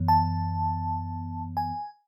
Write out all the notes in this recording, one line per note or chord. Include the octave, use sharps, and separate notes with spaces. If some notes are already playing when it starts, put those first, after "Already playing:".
Already playing: F#2 E3 B3
A5
G#5